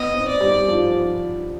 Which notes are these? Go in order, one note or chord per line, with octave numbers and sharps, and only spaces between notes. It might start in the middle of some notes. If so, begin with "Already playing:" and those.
Already playing: B3 D#5
C4
D5
G3
F3